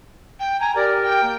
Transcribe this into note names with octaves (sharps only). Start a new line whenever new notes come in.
G5
G#5 A#5
G4 A#4 D5
G5
A#3